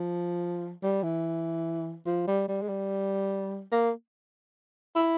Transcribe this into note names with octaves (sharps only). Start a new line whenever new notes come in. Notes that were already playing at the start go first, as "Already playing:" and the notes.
Already playing: F3
G3
E3
F3
G3
G3
G#3
G3
A#3
E4